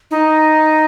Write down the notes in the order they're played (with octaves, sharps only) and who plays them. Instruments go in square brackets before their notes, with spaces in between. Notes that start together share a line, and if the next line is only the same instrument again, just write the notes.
[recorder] D#4